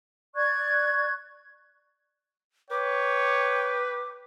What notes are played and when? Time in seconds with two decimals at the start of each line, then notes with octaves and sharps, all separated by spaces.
0.36 D5 C#6 F#6 G#6
2.71 B4 C#5 G5 D6